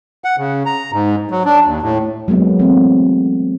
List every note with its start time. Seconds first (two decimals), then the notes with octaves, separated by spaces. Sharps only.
0.24 F#5
0.38 C#3
0.66 A#5
0.92 G#2
1.31 F#3
1.45 D4
1.66 D#2
1.82 A2
2.28 F#3 G#3 A#3 B3
2.59 E3 A3 C4